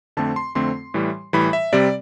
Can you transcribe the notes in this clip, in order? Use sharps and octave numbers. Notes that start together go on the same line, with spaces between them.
F2 D3 A3 C4 A5
C6
F2 D3 A3 C4 C6
A2 E3 G3
A2 E3 G3 B5
E5
C3 G3 C4 D5